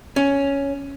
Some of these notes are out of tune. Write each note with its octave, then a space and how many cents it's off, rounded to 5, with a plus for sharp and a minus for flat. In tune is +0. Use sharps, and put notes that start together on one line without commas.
C#4 +5